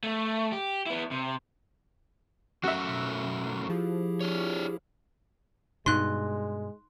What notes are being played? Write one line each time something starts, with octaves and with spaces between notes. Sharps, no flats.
A3
G4
B3 E4
C3
F#3 A3 C#4 F#4 E5
B2
F3 E4 G4 G#4
D4 C#5
G2 B2 G#3 D#4 C6 F#6